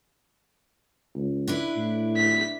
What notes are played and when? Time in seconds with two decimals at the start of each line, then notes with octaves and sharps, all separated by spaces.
1.16 C#2
1.48 D4 E4 B4
1.76 A2
2.17 B6